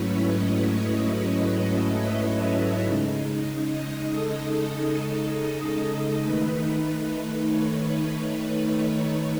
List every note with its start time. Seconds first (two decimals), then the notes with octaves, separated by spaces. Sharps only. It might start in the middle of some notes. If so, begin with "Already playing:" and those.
Already playing: G#2 F#3 A3 C#4 E4 B4 C#5
0.32 D#5
0.74 C#5
1.17 B4
1.59 A4
2.00 E5
2.84 C#3 G#3 D#4
3.69 D#5
4.12 A4
4.54 A4
6.22 D#3 A3 D#4 B4
7.06 B4
7.49 C#5